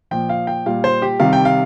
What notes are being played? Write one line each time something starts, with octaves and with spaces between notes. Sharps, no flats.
A#2 F3 G5
F5
G5
A#2 G3 F5
C5
G4
C3 D#3 G3 F5
G5
F5